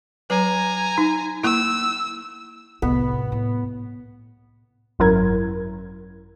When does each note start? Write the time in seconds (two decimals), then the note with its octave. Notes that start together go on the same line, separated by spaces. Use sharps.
0.30 F#3 B4 G#5 A#5
0.98 D#4
1.43 A#3 E4 E6
2.82 C2 A2 B3
3.32 A2
4.99 G#1 F#2 F#3 E4 A#4 G#6